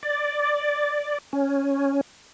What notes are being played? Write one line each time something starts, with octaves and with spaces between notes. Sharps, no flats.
D5
C#4